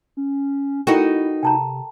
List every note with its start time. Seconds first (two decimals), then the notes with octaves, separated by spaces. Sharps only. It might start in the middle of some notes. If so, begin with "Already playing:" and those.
0.17 C#4
0.87 D#4 E4 F#4 A4 A#4 G5
1.43 C3 G5 A5 A#5